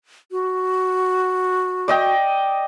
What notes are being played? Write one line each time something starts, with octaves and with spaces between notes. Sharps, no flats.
F#4
D5 D#5 G5